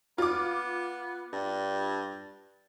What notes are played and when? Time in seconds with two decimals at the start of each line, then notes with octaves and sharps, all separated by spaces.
0.18 B3 F4 D6
1.33 G2